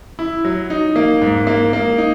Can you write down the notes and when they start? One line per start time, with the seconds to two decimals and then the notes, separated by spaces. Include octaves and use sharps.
0.19 E4
0.45 F#3
0.70 D#4
0.96 A#3
1.22 G#2
1.47 A#3
1.73 A#3
1.98 D#4